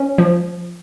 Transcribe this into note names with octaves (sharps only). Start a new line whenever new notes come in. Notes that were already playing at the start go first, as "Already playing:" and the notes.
Already playing: C#4
F3